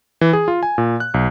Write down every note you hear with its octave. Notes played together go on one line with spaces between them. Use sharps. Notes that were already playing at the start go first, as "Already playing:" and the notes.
E3
G#4
F4
G#5
A#2
F#6
B1